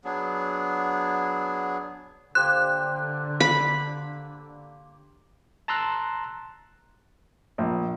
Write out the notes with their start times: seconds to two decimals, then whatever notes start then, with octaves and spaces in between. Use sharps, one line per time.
0.05 F#3 B3 D4 G#4
2.35 D3 A#3 G4 C5 F#6
3.40 B5
5.68 A5 A#5 C6 E6 F#6
7.58 A#1